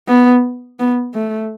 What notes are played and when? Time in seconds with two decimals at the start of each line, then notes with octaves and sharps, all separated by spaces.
0.08 B3
0.79 B3
1.14 A3